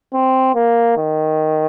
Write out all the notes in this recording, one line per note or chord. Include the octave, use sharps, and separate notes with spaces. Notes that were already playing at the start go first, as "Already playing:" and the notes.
C4
A#3
D#3